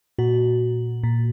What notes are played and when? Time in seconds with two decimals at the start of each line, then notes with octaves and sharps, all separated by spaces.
0.18 A#2 F#4
1.03 A#2